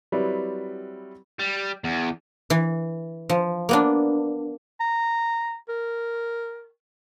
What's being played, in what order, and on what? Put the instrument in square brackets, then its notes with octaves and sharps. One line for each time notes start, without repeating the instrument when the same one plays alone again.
[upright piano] F#3 G3 C4 E4 B4 D5
[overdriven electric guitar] G3
E2
[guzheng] E3
F3
A#3 B3 D4
[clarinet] A#5
A#4